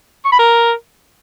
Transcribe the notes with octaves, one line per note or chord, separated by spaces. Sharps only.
C#6
B5
A#4